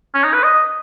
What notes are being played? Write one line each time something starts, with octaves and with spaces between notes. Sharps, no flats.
C#4
D#4
B4
D#5